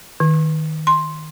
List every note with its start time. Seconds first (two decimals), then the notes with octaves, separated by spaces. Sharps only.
0.20 D#3
0.87 C6